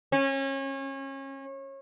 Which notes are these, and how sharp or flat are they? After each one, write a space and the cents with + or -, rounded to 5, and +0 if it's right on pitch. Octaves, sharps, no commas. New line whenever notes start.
C#4 -30